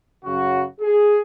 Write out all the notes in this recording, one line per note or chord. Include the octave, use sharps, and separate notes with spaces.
F#2 C#3 F#3 F#4
G#4